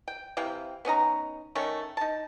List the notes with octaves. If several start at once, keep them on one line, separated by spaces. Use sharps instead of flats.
G5
C3 E3 F5 G5
B3 C#4 D#4 A#5
D#3 A3 C#4 C#5
D#4 A5